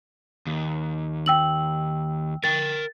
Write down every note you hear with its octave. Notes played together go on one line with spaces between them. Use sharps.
D#2
G5 E6 F#7
A#4 G5 A6